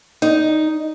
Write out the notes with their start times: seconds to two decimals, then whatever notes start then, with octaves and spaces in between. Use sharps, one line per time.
0.22 D#4